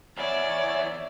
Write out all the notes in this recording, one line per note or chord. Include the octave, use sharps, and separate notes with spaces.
E2 E4 C#5 D5